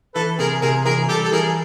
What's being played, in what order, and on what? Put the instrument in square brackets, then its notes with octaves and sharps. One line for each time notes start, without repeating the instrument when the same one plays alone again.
[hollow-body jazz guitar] E3 [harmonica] A4 B4
[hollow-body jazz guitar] C3 [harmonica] G#4 A#4
[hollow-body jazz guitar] C3 [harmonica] G#4 A#4
[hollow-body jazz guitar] E3 [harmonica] G#4 A#4
[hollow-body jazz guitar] G3 [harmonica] G4 A4
[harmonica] A4
[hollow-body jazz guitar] E3 [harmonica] G#4 A#4